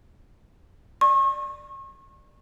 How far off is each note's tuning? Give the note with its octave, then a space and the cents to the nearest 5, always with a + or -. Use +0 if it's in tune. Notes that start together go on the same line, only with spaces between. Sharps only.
D5 +15 C#6 -35